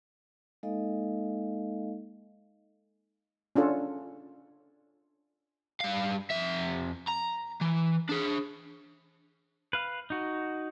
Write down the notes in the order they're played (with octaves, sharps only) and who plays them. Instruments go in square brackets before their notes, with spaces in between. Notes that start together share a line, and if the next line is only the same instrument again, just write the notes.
[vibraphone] G#3 A#3 D#4 A4 D#5 F5
[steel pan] C#4 D4 F4 A4
[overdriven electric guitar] G2 F5
F2 E5
A#5
E3
D4 G#4
[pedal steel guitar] B4 F5
D#4 F#4